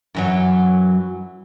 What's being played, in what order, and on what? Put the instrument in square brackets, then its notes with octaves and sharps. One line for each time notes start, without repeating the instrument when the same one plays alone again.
[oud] F#2 E3 F#3